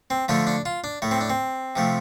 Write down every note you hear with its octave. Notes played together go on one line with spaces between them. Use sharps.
C4
D3 F3 A3 D4
D4
F4
D4
A2 A3
C4
D4
C4
C3 F3 A3